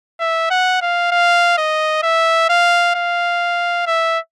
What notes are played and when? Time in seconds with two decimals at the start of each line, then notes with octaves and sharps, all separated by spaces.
0.20 E5
0.51 F#5
0.82 F5
1.12 F5
1.58 D#5
2.03 E5
2.49 F5
2.95 F5
3.87 E5